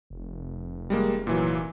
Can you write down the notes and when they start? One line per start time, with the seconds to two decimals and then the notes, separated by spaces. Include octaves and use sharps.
0.10 F1
0.90 G3 G#3 A#3
1.27 A#2 E3 F#3